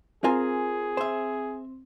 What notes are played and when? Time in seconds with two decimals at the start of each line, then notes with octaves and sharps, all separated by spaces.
0.24 C4 F4 G#4 A#4 G#5
0.97 C5 E5